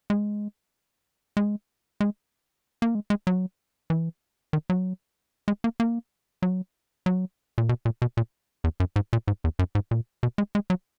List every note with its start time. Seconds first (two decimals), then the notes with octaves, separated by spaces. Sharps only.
0.10 G#3
1.37 G#3
2.01 G#3
2.82 A#3
2.95 G#3
3.10 G#3
3.27 F#3
3.90 E3
4.53 D#3
4.70 F#3
5.48 G#3
5.64 A#3
5.80 A#3
6.42 F#3
7.06 F#3
7.58 A#2
7.69 B2
7.85 A#2
8.02 B2
8.17 A#2
8.64 E2
8.80 F#2
8.96 G#2
9.13 A#2
9.28 G#2
9.44 E2
9.59 F#2
9.75 G#2
9.91 A#2
10.23 B2
10.38 G#3
10.55 G#3
10.70 F#3